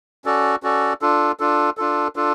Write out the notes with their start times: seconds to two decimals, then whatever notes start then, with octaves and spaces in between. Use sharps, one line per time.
0.25 C#4 F#4 A4 D5
0.63 C#4 F#4 A4 D5
1.01 D4 F4 A4
1.40 D4 F4 A4
1.77 D4 F4 A4
2.16 D4 F4 A4